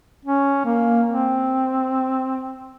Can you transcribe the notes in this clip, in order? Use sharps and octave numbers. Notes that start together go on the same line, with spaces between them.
C#4
A#3
C4